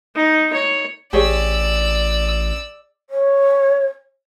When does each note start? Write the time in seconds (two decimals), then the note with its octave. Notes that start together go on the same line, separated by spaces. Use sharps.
0.16 D#4
0.53 C#5
1.13 A1 G4 G#4 C#5 D5 E6
3.10 C#5